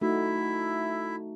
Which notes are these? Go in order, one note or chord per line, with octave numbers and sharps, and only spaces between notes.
A3 D#4 E4 F#4 E5